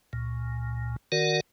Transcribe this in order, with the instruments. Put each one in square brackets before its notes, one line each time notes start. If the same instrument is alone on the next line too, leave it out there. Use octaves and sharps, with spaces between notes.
[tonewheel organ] C#2 A#2
D#3 F#4 A#4 D5 F#5